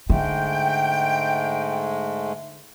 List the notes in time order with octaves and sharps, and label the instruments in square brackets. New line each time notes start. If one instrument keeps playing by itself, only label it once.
[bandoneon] G#2 G#3 A3 [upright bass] D3 [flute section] G5